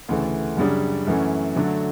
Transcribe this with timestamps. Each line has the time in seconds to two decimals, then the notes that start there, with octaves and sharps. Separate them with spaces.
0.09 D2 C#3 E3 A3
0.57 F#2 C#3 G3 D4
1.07 F#2 E3 A3 C#4
1.56 D3 F#3 A3 D4